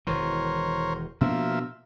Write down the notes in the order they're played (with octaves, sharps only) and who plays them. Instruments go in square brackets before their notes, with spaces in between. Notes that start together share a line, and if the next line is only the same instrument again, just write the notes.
[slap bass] E1 D#3 E3 [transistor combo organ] A#4 C5 C#5
[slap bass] B2 B3 D4 [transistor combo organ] F3 A#3 E5